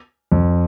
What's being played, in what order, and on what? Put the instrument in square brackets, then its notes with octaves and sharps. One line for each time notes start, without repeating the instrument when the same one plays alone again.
[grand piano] F2